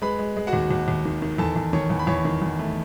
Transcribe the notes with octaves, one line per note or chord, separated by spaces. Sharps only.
G#3 B4 B5
G#3
G#3
F#4 F#5
D#2
D#2
D#2
D#3
D#3
E2 A4 A5
E2
D#3 C#5 C#6
E2
B5
E2 C#5 C#6
D#3
E2
A3